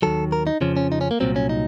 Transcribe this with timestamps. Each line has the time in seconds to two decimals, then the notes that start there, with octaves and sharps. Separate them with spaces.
0.02 D#2 D#3 F#3 A4
0.32 A#4
0.47 D#4
0.61 F2 C#3 F3 C#4
0.77 C#4
0.92 D#4
1.01 C#4
1.11 A#3
1.20 C2 A#2 F#3 C4
1.36 C#4
1.49 D#4